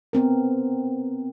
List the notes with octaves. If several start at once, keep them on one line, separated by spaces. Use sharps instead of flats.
B3 C4 A#4